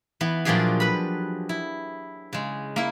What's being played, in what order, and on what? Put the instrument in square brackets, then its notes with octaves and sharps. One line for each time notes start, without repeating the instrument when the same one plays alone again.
[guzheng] E3 B3
A#2 F3 F#3 D4 G4 G#4
B4 B5
E4
C#3 G#3
A#3 E4